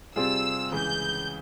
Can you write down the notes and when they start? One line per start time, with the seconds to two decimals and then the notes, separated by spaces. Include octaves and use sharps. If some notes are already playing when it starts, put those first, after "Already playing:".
0.16 C3 G3 C4 F4 G#4 E6
0.72 C#2 C#3 E3 G6